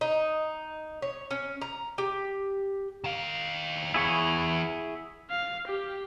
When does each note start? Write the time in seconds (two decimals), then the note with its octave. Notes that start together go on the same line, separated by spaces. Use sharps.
0.01 D#4
1.02 C#5
1.31 C#4
1.61 A#5
1.98 G4
3.04 D#3 F5
3.94 E2 E4 G#4 C#5
5.31 F5
5.67 G4